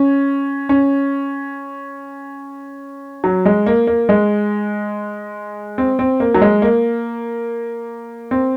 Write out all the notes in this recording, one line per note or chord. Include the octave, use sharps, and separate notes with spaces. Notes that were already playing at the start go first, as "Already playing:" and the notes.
Already playing: C#4
C#4
F#3
G#3
A#3
A#3
G#3
C4
C4
A#3
F#3
G#3
A#3
C4